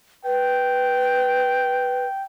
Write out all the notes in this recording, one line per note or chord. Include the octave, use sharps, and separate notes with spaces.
B4 G5